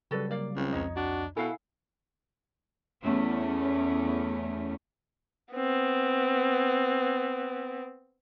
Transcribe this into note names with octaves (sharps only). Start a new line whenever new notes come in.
C#3 F#3 G3 F#4 A4 B4
A#3 D5 F5
C#2 C4
C2 F2 D#4 C#5 D#5
D4 F#4
B2 E4 A4 F5 F#5 G#5
E2 A3 C#4
B3 C4